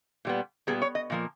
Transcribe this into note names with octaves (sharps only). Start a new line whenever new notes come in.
A#2 G3 B3
A#2 G3 B3 G#4
C#5
D#5
A#2 F3 A#3